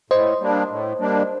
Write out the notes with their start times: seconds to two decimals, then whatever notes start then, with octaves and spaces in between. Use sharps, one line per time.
0.10 A2 C5 D#5
0.40 G3 A#3 D4
0.70 A2
1.00 G3 A#3 D4